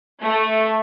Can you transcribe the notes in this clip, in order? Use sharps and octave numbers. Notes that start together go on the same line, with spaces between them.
A3